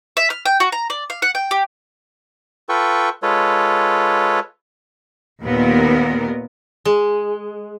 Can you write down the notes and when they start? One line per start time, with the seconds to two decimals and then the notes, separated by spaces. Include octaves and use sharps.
0.17 E5
0.30 F6
0.46 G5
0.60 F#4
0.72 A#5
0.90 D5
1.10 F5
1.22 F#5
1.35 G5
1.51 G4
2.69 F4 A4 B4 G5 C#6
3.23 G#3 F4 A4 B4 C#5
5.42 D#2 A#2 B3 A#4
6.85 G#3